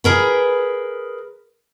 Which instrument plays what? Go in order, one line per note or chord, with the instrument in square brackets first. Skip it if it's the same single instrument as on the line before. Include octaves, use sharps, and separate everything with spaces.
[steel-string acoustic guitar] G#4 A#4 B4